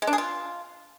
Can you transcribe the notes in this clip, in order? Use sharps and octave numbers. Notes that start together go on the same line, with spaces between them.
G#3
D4
G#4
F4